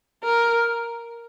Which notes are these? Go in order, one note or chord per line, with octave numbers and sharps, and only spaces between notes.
A#4